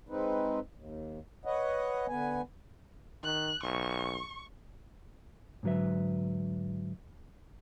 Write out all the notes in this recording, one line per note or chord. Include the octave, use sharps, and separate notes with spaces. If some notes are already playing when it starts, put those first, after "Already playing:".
G#3 C4 D#4 B4
D#2
B4 C#5 D#5 F#5
D3 B3 B4 G#5
D#3 F#6
B1 C#6
G#2 D3 F#3 B4 E5